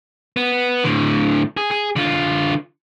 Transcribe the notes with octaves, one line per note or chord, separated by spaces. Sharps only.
B3
A2 D3
G#4
G#4
D3 F4